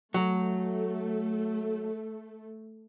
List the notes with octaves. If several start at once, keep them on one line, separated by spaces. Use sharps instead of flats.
F#3 A3